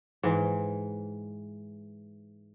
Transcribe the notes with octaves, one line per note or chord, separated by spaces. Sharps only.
G#2 E3